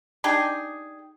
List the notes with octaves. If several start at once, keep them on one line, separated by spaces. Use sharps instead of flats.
D4 D#4 G4 G#4